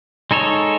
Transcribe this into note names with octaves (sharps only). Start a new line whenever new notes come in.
G#3 D#4 A4 C#5